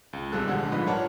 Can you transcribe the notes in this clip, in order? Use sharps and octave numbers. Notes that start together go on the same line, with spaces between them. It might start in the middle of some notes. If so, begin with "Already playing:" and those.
C#2
B1 C3 G3 G#3 A4 F#6
A#1 D3 G#3 F#5 G#6
G#2 F3 G3 B4 D#5 B5
D4 F4 A#4 C#5 F#5 A5